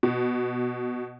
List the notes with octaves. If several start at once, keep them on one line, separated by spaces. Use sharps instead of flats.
B2